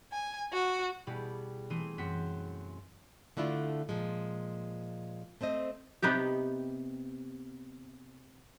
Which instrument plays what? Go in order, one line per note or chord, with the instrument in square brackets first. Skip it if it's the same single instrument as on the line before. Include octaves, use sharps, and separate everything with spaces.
[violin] G#5
F#4
[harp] B2 G3 B3 E4 G4 G#4
E3 A3 C4 G#4 C5 D#7
F#2 C4 F#4 B6
[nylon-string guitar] D3 A3 D4 E4 F4
A#2 F3 G#3
A3 C4 C5 D#5
[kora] C3 B3 D#4 G4